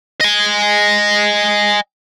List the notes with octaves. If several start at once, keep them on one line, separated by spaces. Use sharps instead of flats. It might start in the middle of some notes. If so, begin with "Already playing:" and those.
D#5 G#5